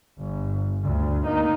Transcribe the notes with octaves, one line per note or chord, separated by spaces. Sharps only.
G1
D2 D3
A#3 D#4